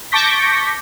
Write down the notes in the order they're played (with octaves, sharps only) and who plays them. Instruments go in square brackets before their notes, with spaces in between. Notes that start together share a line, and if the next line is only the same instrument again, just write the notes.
[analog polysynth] A5 C#6 D6 G6 A#6 B6